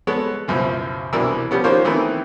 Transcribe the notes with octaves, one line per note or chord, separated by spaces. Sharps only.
G#3 B3 A4 C#5
C#2 F#2 B2 F3 E4
C2 B2 E3 D4 A#4 E6
F3 G3 B3 C#4
D#3 F3 A#3 F4 C5 C#5
D#3 E3 A3 B3 C4 A#4